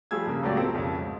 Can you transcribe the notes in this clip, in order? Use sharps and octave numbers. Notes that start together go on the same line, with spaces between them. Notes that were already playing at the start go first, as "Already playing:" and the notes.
F3 G3 A3 G#4 E6 G#6
G2 C#3 A#3
C#2 A2 F#3 A#3 G4 D5
C4 F4 G4 A4 A#4
B1 F2 C#3
G#2